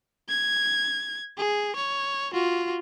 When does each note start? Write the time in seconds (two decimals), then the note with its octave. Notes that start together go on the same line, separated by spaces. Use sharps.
0.29 G#6
1.38 G#4
1.76 C#5
2.34 F4 F#4